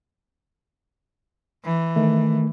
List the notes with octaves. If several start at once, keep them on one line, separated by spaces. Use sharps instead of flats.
E3
D#3 A3